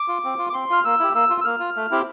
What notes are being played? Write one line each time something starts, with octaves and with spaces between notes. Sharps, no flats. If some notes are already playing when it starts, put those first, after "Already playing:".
Already playing: D6
F4
C4
F4
D6
C4 C6
F4 F6
A#3 E6
E4 G4
A#3 E6
F4
E6
A#3 F6
F4
A3
C4 E4 G4